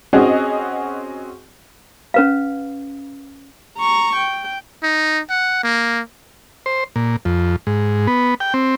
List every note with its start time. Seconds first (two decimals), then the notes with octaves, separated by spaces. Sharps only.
0.13 C4 C#4 F#4 G#4 D#5
2.14 C#4 B4 F5
3.78 A#5 C#6
4.16 G5
4.83 D#4
5.30 F#5
5.63 A#3
6.66 C5
6.96 A#2
7.25 F2
7.67 G#2
8.07 B3
8.40 G5
8.54 C4